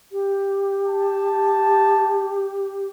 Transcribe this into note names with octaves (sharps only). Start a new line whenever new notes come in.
G4
A5